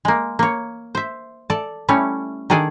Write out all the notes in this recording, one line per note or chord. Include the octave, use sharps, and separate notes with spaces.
G#3 A#3
A#3 C#5
C5 E5
A4 D5 A5
G3 A3 C#4 E4 C#5
D#3 D4 G#4 A4 D5 G#5